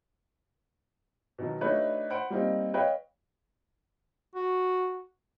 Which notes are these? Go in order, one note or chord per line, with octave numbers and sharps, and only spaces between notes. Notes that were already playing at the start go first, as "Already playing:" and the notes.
B2 D#3 F#3
A3 D4 D#4 F#4 B4 C#5
C5 F#5 B5 D7
G3 A#3 C4 D#4
B4 C#5 D#5 F5 G5
F#4